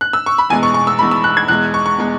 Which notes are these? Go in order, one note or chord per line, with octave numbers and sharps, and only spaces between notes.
F#6
E6
C#6
B5
E2 B2 G#3 G#5
C#6
C#6
E6
E2 B2 G#3 B5
E6
F#6
G#6
E2 B2 G#3 F#6
C#6
C#6
B2 G#3